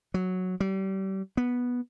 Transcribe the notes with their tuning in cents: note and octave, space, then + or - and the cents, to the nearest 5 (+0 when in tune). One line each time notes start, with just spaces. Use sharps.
F#3 -5
G3 -35
B3 -10